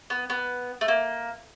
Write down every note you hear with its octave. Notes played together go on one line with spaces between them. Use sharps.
B3
B3
A3
A#3